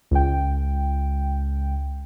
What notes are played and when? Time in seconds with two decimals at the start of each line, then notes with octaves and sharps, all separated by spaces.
0.11 C#2 G5